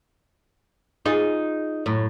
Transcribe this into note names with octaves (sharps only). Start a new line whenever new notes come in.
D#4 F4 G#4
F#2 A2